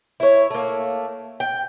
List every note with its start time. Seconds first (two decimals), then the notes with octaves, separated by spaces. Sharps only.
0.20 E4 C#5
0.50 A3 A#3
1.40 G5